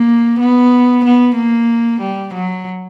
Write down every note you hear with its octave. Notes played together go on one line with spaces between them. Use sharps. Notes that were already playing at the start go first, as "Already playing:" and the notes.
Already playing: A#3
B3
B3
A#3
G3
F#3